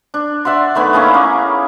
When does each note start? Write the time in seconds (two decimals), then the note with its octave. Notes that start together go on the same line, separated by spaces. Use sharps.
0.14 D4
0.45 D5 E5 F#5 C6
0.75 D#3 A3 B3 G#5
0.93 A#3 C#4 E4 G#4
1.14 A#3